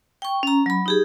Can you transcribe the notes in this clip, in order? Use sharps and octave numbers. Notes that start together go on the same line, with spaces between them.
G5 C#6
C#4 A#5
F#3 B5
D#4 G4 G#4